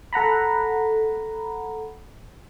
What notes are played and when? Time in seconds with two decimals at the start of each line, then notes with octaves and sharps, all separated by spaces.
0.13 A4 F#5 A#5 B5